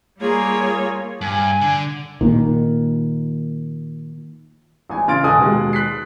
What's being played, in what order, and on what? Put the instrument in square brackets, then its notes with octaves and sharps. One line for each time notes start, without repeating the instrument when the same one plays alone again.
[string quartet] G3 A#3 F4 G#4 A#4 C#5
[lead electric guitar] G2 [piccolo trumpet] G#5
[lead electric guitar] D3
[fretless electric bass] A#2 D#3
[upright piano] A1 G#5
C#3 C6 F6 A6 D7
D#1 A4 D#5 G#5 D#6 F#6
D#2 B2 G#3
F#6 B6 C7